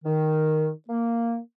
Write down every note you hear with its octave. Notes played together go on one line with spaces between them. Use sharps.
D#3
A#3